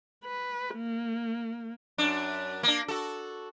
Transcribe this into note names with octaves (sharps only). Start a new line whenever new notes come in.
B4
A#3
F#2 D4
A#3 D4
F#4 A4